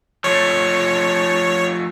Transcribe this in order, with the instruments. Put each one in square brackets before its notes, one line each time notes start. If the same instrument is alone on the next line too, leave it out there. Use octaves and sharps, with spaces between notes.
[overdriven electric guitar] F3 A3 [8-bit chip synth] C#5